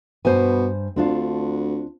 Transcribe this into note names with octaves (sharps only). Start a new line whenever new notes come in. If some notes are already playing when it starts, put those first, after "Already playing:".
G2 B2 C5 G#5
D2 C4 D4 F4